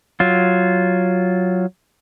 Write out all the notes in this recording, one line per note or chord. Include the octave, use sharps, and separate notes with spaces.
F#3 F4